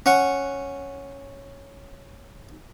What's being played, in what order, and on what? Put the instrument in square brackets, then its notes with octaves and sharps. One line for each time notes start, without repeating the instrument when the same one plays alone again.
[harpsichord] C#4 F#5 C#6